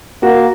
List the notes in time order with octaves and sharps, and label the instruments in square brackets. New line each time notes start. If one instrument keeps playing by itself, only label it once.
[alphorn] A#3 [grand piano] F#4